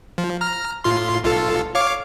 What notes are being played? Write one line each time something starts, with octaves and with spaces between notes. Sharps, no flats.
F3
A#5 F6
A2 F4 C6
B1 F4 A4
C#5 F5 D6